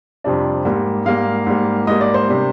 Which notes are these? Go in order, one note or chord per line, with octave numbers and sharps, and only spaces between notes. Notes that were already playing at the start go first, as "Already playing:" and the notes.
F2 C3 G3 D4
G#2 G3 A#3
G#2 G3 A#3 F5
G#2 G3 A#3
G#2 G3 A#3 D#5
D5
C5
C3 G3 A#3 D4